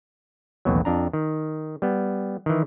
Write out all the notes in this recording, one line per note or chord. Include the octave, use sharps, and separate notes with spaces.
A1 D#2 B2 F#3
F2 D4 A#5
D#3
G3 B3
D#3 E3